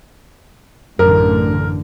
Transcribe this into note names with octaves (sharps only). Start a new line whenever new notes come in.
A1 F#2 D3 A#4